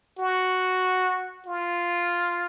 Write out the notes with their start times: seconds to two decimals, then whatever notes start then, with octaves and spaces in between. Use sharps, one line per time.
0.19 F#4
1.46 F4